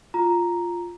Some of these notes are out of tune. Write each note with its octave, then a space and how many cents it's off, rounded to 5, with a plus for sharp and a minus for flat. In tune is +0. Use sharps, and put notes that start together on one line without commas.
F4 +0 A#5 +0